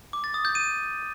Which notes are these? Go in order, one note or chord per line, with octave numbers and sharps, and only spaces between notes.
D6
A6
D#6
G6
D#7